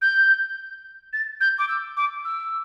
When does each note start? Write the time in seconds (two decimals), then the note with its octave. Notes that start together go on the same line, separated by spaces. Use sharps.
0.02 G6
1.13 A6
1.40 G6
1.58 D6
1.68 E6
1.97 D6
2.25 E6